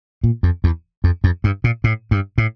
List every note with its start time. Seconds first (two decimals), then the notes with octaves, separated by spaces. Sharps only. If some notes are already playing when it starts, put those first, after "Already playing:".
0.24 A#2
0.43 F2
0.64 E2
1.04 F2
1.24 F2
1.44 G2
1.64 A#2
1.84 A2
2.11 G2
2.38 A2